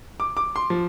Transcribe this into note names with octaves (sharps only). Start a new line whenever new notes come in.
D6
D6
C6
F3